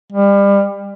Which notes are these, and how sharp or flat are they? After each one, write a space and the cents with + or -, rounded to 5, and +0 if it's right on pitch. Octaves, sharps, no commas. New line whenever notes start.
G3 +30